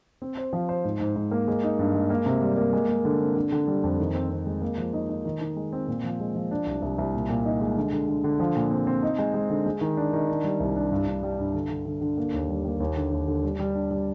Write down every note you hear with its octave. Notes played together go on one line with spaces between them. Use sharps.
C4
C5
F3
C5
G#2
G#2
G#2
A#3
G#3
D#4
G2
G#3
A#3
C3
G3
A#3
G#3
G#3
D3
C4
D3
D3
G3
F2
D#3
C4
C4
G#3
A#3
F3
D#4
D#4
D#3
D#3
G#3
C4
A#2
F3
G#3
F3
D4
C2
C2
C2
A#2
A#2
D#4
G#3
D3
D3
D3
D3
F3
A#2
C4
C4
D#4
G#3
G#3
D3
G#3
D#3
D4
D#3
D4
G3
C2
D4
G2
G2
G3
G2
D3
D3
D3
D3
A#3
D#2
G3
A#3
D#2
D3
D#2
D3
G3
G3
D4
G3